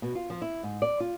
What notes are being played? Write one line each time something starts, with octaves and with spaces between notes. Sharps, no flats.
B2
F4
F3
E4
G#2
D5
F4